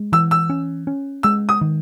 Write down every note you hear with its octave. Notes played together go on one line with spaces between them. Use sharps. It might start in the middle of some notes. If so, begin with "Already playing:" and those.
Already playing: G#3
E3 E6
E6
C#4
C#4
G#3 E6
D#6
D#3